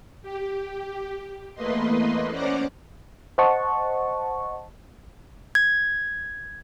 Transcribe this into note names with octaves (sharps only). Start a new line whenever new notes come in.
G4
E2 A3 A#3 B4 D#5 C6
C#4 C5 D5 F#5 A#5 D6
C5 D#5 F#5 A5 C#6
G#6